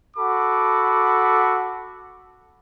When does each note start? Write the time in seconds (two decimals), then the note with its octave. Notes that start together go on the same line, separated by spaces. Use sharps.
0.17 F#4 A4 B5 D6